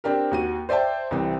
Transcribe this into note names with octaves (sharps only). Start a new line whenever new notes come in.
C4 D4 G4 A#4
D#2 F#4 D#7
C5 D5 E5 G5 A5
C2 E3 C4